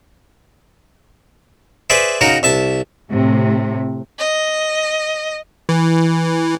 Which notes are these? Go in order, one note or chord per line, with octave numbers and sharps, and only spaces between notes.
G#4 B4 C5 D5 E5
C#3 D#4 F#4 A#4
C2 E5 A5
A2 C3
D#5
E3